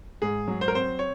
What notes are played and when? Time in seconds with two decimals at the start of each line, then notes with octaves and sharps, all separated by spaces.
0.22 G#2 G#4
0.48 F#3
0.61 C5
0.68 A#4
0.74 C4 C5
0.99 C#5